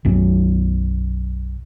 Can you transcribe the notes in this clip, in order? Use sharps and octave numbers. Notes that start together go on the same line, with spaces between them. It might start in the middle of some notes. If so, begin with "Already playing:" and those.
B1 F#2 F#3